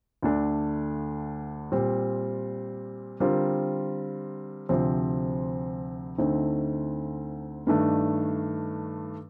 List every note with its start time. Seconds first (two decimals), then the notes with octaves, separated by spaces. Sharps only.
0.23 D2 D3 A3 D4 A4
1.72 A#2 G3 C4
3.20 D3 G3 C4 F4 A#4
4.69 D2 C3 F3 C4
6.18 D2 D3 A3 C4 D#4
7.67 G2 D#3 A3 D4